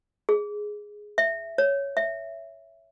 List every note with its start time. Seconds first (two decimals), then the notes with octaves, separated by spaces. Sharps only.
0.29 G#4
1.18 E5
1.58 C#5
1.97 E5